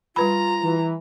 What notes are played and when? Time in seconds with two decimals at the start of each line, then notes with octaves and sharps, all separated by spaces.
0.16 G3 F4 B4 A#5 B5
0.62 E3